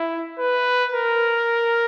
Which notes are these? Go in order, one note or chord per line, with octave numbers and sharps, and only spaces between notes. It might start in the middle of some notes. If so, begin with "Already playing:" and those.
Already playing: E4
B4
A#4